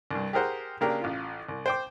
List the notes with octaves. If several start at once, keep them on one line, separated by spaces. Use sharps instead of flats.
C2 G2
G4 G#4 A#4 C5 F#5
C#3 A#3 D4 G4 A#4
A1 F4
C2
C5 G5 D6